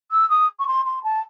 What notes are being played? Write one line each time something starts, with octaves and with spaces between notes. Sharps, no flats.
E6
D#6
C#6
C6
C6
A5